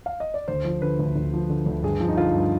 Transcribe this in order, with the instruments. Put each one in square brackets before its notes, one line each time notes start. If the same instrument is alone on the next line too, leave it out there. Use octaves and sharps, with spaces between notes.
[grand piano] F5
D#5
D5
D2 C5
F3
D3 B4
D2
D2
F3
D3
D2
G2 G#4
F3
D#4
D3 F4
G2